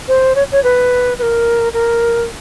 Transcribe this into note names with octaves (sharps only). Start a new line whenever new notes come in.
C5
C#5
C#5
B4
B4
A#4
A#4